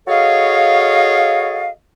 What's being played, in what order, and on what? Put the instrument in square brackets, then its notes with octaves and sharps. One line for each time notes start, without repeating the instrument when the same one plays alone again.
[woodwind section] F#4 G#4 A4 C#5 D#5 F5